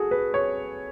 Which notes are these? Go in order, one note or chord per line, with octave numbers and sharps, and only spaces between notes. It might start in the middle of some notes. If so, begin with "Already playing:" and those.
Already playing: F#4 G#4 A4
B4
C#5